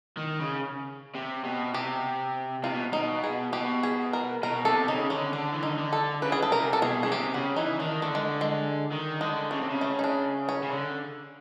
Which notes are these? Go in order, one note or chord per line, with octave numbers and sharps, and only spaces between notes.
D#3
C#3
C3
B2
C3 G4
C3 F4
B2
B2 D#4
G#4
B2 G4
G#4
A#4
B2 A#4
C3 A4
C#3 D#4
D3 C#4
D3 D4
E3
D#3 D#4
D3
A4
C#3 B4
G#4
A4
C3 A#4
A4
B2 G#4
C#3 G#4
C3 G4
C#3 F#4
E3 D#4
D#3 D4
D3 A3
G#3
G#3
D#3
D3 G#3
C#3 A3
C3
C#3
A3
D#4
D4
C#4
C#3
D3